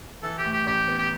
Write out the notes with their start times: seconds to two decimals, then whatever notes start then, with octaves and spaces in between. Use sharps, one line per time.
0.23 E3 A4
0.38 G4
0.45 A2
0.53 G4
0.66 A1 G4
0.88 B3
0.99 G4